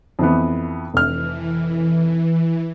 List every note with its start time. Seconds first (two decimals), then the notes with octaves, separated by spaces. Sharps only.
0.19 F2 E3 B3
0.94 F1 E3 F6